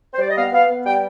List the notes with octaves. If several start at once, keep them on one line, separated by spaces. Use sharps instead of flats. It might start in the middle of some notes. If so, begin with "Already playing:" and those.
C5
G3 D5
D#5
B3 F5
B3 F5
B3
G3 G5